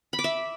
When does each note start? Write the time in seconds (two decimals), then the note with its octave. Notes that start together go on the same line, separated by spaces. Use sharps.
0.13 B5
0.19 D6
0.24 E5